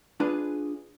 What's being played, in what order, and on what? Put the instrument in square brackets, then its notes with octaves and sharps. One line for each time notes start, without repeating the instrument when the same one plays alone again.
[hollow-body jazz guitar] D4 F4 G#4 B4